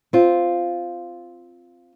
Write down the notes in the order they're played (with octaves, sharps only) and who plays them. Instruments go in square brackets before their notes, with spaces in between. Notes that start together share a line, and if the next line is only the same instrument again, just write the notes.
[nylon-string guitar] C4 F4